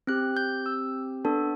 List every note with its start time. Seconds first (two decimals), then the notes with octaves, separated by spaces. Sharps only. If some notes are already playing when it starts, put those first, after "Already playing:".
0.07 C4 G4 F#6
0.37 G6
0.66 E6
1.25 B3 D4 A4